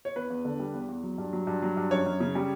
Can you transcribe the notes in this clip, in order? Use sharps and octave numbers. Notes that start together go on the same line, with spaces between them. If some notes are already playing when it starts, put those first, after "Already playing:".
C#5
E2 B4
E2
D3
G3
E2
E2
F#3
G2
F#3
G2
F#3
G2
F#2 C#5
F#2
C#3
G3